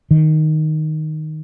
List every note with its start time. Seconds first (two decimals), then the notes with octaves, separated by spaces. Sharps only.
0.11 D#3